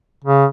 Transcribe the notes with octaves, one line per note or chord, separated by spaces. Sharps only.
C#3